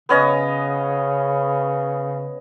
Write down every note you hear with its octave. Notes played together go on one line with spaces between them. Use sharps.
C#3 B3 C#4 D#5